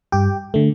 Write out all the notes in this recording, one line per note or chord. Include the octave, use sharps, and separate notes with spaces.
G2 G4 G5
D3 A3